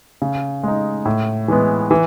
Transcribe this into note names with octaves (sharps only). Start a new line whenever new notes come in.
C#3
G#3 D#4
A2
E3 G#3 B3
E3